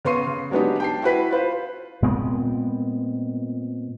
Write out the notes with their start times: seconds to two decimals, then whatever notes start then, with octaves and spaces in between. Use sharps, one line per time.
0.05 C#3 B3 C6 C#6 C7 D#7
0.27 C#3
0.51 F#3 G#3 B3 D4 D#4 G4
0.80 G5 A5 C7
1.02 E4 F#4 B4 B6
1.31 F4 B4 C5
2.02 A#2 G#3 B3 C4